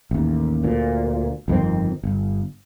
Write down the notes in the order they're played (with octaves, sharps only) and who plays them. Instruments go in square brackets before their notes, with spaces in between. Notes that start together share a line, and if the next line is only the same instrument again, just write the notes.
[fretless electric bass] A1 D#2
D2 A#2
G1 F2 D#3 C4
G1